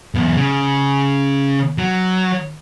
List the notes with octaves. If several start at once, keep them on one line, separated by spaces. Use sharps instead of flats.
B1 E2
C#3
F#3